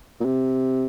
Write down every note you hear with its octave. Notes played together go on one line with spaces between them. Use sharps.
A#2
C3